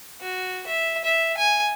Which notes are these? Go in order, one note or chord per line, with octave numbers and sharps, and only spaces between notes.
F#4
E5
E5
G#5